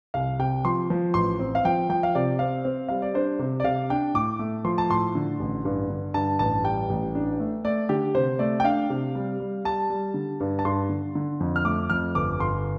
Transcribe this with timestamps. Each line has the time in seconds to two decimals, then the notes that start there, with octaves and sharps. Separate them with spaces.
0.14 C2 F5
0.39 C3 G5
0.65 F3 C6
0.90 F3
1.14 A1 C6
1.39 C4
1.55 F5
1.65 F3 G5
1.90 F3 G5
2.03 F5
2.15 C3 D5
2.39 C4 F5
2.65 C4
2.88 G3 F5
3.02 D5
3.14 D4 C5
3.39 C3
3.60 D5
3.64 C3 F5
3.90 D4 G5
4.14 A2 D6
4.39 A3
4.65 F3 C6
4.78 A5
4.90 A2 C6
5.15 D3
5.40 A1
5.65 G2
5.90 D3
6.14 G2 A5
6.39 A1 A5
6.64 G3 G5
6.90 A1
7.15 D4
7.40 A3
7.64 A3 D5
7.89 D3 G4
8.15 C3 C5
8.39 A3 D5
8.60 G5
8.64 D4 F5
8.90 C3
9.15 G3
9.40 G3
9.65 G3 A5
9.90 G3
10.14 D3
10.40 G2
10.59 A5
10.65 G2 C6
10.89 D3
11.15 D3
11.40 F2
11.56 F6
11.64 A3 D6
11.90 F2 F6
12.15 G1 D6
12.40 G1 C6